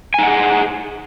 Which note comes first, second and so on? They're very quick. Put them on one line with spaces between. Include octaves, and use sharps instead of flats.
G#5 D#4 F#5 G#4